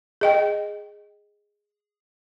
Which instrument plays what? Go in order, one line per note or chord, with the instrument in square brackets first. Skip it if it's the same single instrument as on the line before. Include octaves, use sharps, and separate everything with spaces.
[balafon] G#4 D#5 G5